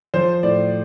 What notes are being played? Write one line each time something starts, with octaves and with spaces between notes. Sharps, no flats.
F3 C5
A2 D5